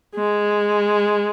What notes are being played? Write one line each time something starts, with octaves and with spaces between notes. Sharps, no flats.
G#3